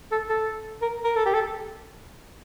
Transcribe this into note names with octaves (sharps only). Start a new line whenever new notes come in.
A4
A4
A#4
A#4
A4
G4
A4